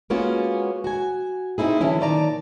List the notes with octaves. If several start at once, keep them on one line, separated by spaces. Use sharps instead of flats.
G#3 A#3 B3 C#4 F4 F#4
F#4 G#5
C4 C#4 D#4 E4 G#4
D3 E3 F#3 C#4 E4
A#2 D#3 D5 A5 A#5